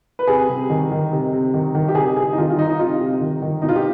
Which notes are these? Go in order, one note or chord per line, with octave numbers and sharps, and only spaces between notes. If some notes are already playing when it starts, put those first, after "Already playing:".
B4
C3 G#4
C3
D#3
D#3
C3
C3
D#3
D#3
G4
C3 G#4
C3 G#4
D#4
D#3 F4
F4
D#3 D#4
D#4
C3 F4
C3
D#3
D#3
B2 D#4
F4
G4